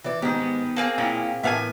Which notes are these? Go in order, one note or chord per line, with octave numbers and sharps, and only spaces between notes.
E3 D5
G#2 D#3 B3 G4
B3 B4
A#3 C4 G#4 A5
A#2 C#4 E4 G5
A2 E3 B3 A#4 E5 F5 G#5